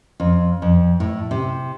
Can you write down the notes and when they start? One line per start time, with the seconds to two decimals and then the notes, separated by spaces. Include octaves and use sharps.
0.20 F2
0.62 F2
1.00 A2
1.31 C3